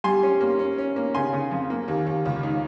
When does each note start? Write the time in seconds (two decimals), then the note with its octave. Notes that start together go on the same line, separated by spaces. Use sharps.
0.04 G3 G#5 C6
0.23 C#4
0.41 A#3
0.59 C#4
0.78 C#4
0.96 A#3
1.15 C#3 G#5 C6
1.33 C#3
1.51 F2
1.70 A#3
1.88 D#2
2.06 D#2
2.25 C#2
2.43 D#3